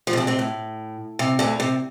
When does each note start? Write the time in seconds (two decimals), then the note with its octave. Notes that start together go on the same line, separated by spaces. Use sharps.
0.07 F2 F3
0.13 C3
0.17 D2 D3
0.27 C3 C4
0.39 A2
1.19 C3
1.39 D2 D3
1.60 C3